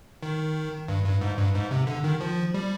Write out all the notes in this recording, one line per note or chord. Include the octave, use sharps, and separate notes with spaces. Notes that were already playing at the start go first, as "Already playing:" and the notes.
D#3
G2
G2
G#2
G2
G#2
C3
D3
D#3
F3
G3